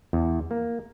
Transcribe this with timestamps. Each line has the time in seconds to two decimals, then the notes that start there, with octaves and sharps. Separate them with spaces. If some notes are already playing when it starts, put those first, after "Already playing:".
0.13 E2
0.51 A#3